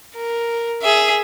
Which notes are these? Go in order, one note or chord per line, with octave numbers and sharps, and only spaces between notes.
A#4
G#4 E5